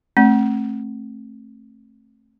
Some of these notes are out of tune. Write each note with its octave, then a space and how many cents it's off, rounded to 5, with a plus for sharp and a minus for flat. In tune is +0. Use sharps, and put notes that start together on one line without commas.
A3 +0 C4 +30